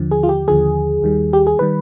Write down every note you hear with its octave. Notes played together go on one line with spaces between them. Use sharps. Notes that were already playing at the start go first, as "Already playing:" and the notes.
Already playing: D#2 D3 F3
G#4
F4
G4
D#2 D3 F3 G#4
D#2 D#3 G3
G4
G#4
D#3 G3 B4